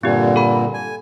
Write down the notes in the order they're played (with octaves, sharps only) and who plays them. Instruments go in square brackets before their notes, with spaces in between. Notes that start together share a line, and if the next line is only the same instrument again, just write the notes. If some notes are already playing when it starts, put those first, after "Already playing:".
[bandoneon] G2 A#2 D3 [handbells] C4 G4
[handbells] A4 B5
[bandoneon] G#5